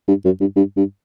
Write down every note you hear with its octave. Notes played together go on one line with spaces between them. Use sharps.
G2
F#2
G2
G2
G2